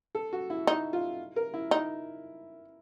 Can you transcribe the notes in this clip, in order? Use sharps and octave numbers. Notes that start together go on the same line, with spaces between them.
A4
F#4
E4
D#4
F4
A#4
E4
D#4